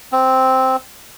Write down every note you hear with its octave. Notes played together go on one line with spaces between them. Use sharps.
C4